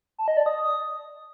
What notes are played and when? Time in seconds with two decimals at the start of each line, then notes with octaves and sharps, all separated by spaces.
0.18 A5
0.28 D#5
0.37 D5
0.46 D#6